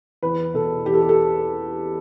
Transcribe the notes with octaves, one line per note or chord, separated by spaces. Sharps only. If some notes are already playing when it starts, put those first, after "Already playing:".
E2 B4
B2 A4
E2 G4
A4
G4
A4